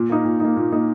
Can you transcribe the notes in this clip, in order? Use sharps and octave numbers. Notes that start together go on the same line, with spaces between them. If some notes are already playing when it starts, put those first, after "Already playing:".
Already playing: A#2
A#3 D#4
A#2
A#3 D#4
A#2
A#3 D#4